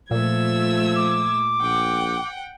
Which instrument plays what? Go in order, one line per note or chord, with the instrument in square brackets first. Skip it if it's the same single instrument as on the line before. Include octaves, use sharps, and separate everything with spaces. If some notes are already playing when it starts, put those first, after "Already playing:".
[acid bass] A#2 [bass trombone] F3 [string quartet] A3 E6 G#6
[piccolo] D6
[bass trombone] A#1 [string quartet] F#5 G5